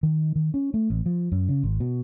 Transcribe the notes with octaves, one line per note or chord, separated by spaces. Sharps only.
D#3
D#3
C#4
A3
A1
F3
F#2
C#3
G#1
B2